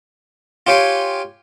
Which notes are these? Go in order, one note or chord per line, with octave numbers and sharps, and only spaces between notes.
F4 G4 C#5 G5 G#5 C6